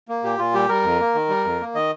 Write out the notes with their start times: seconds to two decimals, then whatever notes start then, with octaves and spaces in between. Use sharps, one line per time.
0.08 A#3
0.23 A#2 G4
0.39 A#2 F4
0.54 G3 G4
0.69 G3 A#4
0.84 F2
1.00 A#3
1.15 D#3
1.29 G3
1.45 F2
1.61 A#3
1.75 D#3 D#5